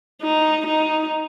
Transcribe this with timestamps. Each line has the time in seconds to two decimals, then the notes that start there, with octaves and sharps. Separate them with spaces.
0.22 D#4
0.66 D#4